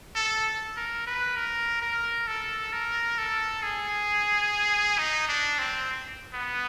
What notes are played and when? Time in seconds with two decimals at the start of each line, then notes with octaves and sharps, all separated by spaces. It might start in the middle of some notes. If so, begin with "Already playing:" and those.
0.15 A4
0.77 A#4
1.06 B4
1.36 A#4
1.82 A#4
2.27 A4
2.72 A#4
3.18 A4
3.63 G#4
4.98 D#4
5.28 D4
5.59 C4
6.33 B3